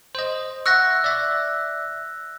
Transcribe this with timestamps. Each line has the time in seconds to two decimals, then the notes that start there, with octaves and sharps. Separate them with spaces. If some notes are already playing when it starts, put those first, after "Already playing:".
0.15 C5 D#5
0.66 E5 F#5 C#6 E6 F#6 A#6
1.04 D5 E5